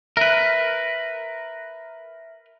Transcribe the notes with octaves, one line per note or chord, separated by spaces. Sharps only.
A#4 B4 E5